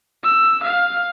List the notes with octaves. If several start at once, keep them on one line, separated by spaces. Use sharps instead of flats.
E6
F5